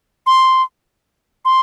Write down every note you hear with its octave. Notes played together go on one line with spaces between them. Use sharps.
C6
C6